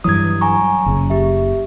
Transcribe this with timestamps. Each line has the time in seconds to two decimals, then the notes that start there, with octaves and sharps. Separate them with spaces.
0.04 G2 E3 F#3 D#6 G#6
0.41 G#5 A#5 C#6
0.86 F#1 C#3
1.10 G4 E5